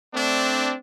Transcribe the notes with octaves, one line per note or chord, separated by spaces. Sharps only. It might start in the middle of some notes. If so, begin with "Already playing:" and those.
A3 C4 D4